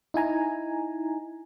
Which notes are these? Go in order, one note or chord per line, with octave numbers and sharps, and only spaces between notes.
D#4 E4 G#5 A#5